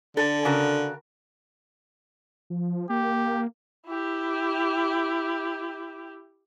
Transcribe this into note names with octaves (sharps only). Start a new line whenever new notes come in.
D3 A4
C#3 F#4 A#4
F3
A#3 G4
E4 G4